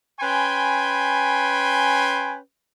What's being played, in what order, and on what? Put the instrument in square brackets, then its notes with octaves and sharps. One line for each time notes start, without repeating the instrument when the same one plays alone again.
[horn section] C#4 B4 G5 G#5 B5 C6